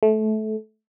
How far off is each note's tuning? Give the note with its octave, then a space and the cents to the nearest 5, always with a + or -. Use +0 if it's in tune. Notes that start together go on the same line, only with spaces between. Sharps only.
A3 -20